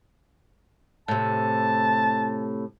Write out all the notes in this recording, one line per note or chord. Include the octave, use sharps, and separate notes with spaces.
A2 C3 A5